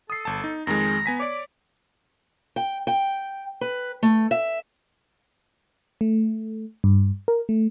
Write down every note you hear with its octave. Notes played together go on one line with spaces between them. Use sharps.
A4 D#6 C7
G1 A5
D#4
F2 D#3 G#3 A#5
B3 G#5 B6
C#5 D5 D6
G5
G5
B4
A3
E5
A3
G2
A#4
A3